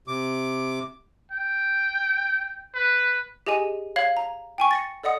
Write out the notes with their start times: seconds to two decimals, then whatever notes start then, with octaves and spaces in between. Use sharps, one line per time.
0.08 C3 D6
1.32 G5
2.74 B4
3.47 G4 G#4 D#5 G#5 D#7
3.96 C#5 F5 G#6 F#7
4.17 A#5
4.58 G5 G#5 C#6
4.71 A6 A#6 C#7
5.03 A4 D5 D#5 F#5 D#6